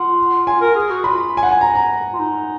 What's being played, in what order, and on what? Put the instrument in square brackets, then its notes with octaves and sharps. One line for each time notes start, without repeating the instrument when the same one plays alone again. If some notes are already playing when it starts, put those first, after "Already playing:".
Already playing: [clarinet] F4 [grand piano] F#5
[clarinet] F4 [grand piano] G#5
[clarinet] A#4
G#4
F#4
[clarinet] F4 [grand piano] B5
[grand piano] G#5
F#5
G#5
A#5
A#5
[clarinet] F4
D#4